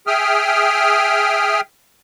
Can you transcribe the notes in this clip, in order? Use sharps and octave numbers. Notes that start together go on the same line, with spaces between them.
G#4 E5 G5 D#6 F6